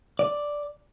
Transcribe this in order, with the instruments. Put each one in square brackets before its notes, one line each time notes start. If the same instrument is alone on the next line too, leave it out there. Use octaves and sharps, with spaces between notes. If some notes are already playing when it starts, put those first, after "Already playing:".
[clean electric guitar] D5